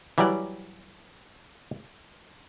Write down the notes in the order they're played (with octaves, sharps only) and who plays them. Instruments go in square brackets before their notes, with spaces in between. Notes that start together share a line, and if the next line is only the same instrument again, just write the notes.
[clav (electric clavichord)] E3 F#3 G3 G4 D5